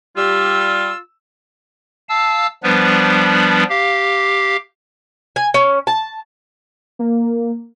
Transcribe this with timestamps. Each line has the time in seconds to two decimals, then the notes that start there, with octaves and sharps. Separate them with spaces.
0.17 G3 F4 E6
2.09 F5 A5 E6
2.63 F3 G3 B3 D4 B4
3.69 G4 F5
5.36 G#5
5.54 C#4
5.87 A5
6.99 A#3